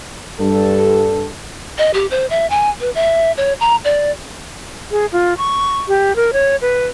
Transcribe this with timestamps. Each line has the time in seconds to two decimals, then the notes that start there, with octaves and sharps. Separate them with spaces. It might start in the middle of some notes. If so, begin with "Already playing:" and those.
0.39 G2 A4
1.78 D#5
1.94 G4
2.11 C5
2.30 E5
2.50 G#5
2.80 B4
2.95 E5
3.37 C#5
3.60 A#5
3.84 D5
4.91 G#4
5.12 F4
5.38 C#6
5.88 G4
6.16 A#4
6.33 C#5
6.62 B4